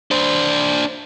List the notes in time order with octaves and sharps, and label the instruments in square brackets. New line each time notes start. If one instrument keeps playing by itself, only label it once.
[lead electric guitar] D4 C5